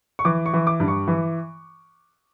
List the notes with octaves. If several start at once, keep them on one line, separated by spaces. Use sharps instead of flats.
C#6
E3 D6
C#6
E3
D6
G2
C#6
E3